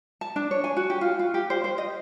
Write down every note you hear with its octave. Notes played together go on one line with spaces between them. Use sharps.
A5
D4
C#5
G#5
F#4
G4
F4
F4
G4
C5
C5
D#5